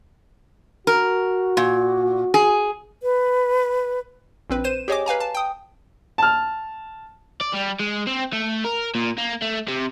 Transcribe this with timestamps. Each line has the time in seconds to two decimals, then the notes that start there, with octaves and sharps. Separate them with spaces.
0.87 F#4 A#4
1.57 A#2
2.34 G#4
3.03 B4
4.50 A#1 C4 B4
4.64 C5 D#7 E7
4.88 G4 G#4 C#5 D#5 G#5 D6
5.06 B4 F5 G#5 A#5
5.20 A5
5.35 G5 D#6
6.18 A5 F6
7.41 D5
7.54 G3
7.80 G#3
8.07 C4
8.33 A3
8.65 A#4
8.95 A#2
9.18 A#3
9.42 A3
9.68 C3